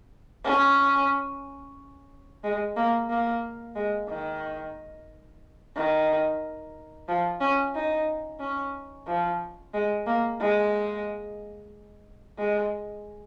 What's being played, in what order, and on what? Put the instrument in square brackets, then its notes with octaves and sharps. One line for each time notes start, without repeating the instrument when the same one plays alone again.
[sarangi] C#4
G#3
A#3
A#3
G#3
D#3
D#3
F3
C#4
D#4
C#4
F3
G#3
A#3
G#3
G#3